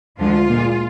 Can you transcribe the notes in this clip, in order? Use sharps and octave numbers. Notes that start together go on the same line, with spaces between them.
D2 D3 F3 G#3 F4
A#2 G#3